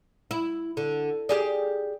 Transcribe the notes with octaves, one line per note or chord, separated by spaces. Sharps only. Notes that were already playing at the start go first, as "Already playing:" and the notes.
E4
D3
G4 G#4 D5